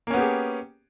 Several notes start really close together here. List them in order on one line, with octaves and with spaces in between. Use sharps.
A#3 C#4 B3 G4 G#4